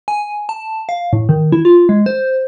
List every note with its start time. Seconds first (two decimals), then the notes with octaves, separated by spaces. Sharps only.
0.08 G#5
0.49 A5
0.89 F5
1.13 A2
1.29 D#3
1.52 E4
1.65 F4
1.89 G#3
2.06 C5